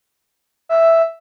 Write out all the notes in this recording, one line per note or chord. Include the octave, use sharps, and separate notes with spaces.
E5